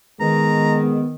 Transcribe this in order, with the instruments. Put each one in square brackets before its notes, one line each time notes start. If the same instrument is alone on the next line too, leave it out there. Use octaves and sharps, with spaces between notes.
[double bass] D#3 [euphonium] G#3 [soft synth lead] B3 [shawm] A#5
[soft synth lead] B3